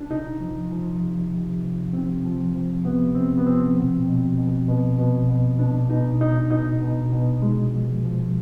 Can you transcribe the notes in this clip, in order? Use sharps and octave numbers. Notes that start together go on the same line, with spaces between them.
D4
C3 D#4
F3
F3
C3
C3
F3
C3 C4
F3
F3
C3 B3
C3 C4
B3
F3 C4
B2
B2
B2
B2
B2
B2
B2 D4
B2 D#4
B2 D#4
B2 D#4
B2
B2
C3 G#3
F3
F3